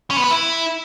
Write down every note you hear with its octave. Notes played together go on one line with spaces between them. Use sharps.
C#4
B3
B4
E4